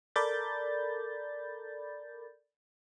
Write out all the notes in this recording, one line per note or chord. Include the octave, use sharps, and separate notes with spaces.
A4 A#4 D5 B5 G6 A6